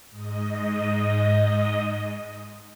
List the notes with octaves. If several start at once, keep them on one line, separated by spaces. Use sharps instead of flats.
G#2 D#5